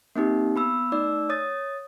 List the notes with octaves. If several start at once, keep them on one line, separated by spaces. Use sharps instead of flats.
A#3 C4 D#4 G4
B3 B5 E6
A3 D#4 D5 E6
C#5 D#6 A6